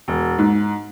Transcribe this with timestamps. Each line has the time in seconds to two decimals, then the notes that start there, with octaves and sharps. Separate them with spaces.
0.08 E1
0.38 G#2